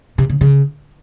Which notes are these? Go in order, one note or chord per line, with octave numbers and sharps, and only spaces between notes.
C3
C#3
C#3